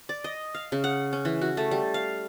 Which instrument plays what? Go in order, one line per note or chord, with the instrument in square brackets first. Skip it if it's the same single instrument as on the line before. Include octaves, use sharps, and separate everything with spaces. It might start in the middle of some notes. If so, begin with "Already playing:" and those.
[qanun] D5
D#5
F5
C#3
F#5
C#4
E3
F#4
A3
G3
F5